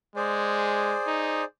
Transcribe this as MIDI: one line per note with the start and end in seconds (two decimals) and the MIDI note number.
0.16 0.95 56
0.16 1.45 68
0.16 1.45 72
0.16 1.45 74
1.07 1.43 63